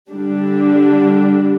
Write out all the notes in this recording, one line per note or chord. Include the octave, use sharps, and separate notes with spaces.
D3 G3 D4 G4